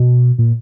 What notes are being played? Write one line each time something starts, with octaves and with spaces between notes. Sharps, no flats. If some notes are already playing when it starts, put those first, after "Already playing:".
Already playing: B2
A#2